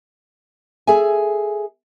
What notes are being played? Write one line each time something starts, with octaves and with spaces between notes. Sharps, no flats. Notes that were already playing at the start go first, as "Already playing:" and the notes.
G#4 A4 E5 G#5